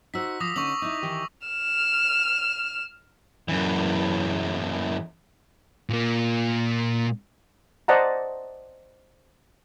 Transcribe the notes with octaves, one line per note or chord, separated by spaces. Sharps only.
D#4 F#4 C5 E6 B6
F3 D6 D#6 A#6
D3 C#4 D#4 C#6 F#7
D#4 E4
D#3 E3 G4
F6 E7
F#2 E3
A#2 A#3
C5 D5 D#5 F#5 A5 A#5